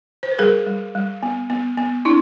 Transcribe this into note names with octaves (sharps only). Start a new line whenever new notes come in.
C5
B4
G3 G#4 A#4
G3
G3
B3
B3
B3
C4 D4 E4